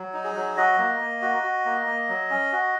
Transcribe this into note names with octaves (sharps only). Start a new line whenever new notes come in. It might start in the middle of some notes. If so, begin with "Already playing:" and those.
Already playing: F#3
D#4
G#4
F#3
F#4 D#5
A#3
A#3
F#4
F#4
A#3
A#3
F#3
C#4
F#4